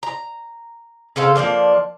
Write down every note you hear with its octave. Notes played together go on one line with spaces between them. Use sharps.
A#5
C#3 A4 C5 F5
F3 G#3 A#3 D4